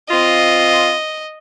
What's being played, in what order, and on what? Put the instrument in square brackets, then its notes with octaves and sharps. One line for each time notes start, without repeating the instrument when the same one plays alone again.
[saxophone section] C4 F4 [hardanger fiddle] D#5